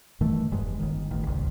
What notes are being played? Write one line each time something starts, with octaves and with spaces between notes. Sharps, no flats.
G2 D#3 E3 A3
E1 G2 G#3
G1 D#3
A1 D#3
D#1 G#1 C#2